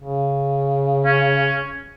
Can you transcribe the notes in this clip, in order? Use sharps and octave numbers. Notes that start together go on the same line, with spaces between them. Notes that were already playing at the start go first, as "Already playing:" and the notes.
C#3
C#4